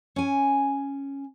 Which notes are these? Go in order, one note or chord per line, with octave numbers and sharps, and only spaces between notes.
C#4 G#5